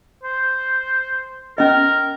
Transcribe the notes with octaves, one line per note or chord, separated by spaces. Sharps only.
C5
C#4 A#4 D#5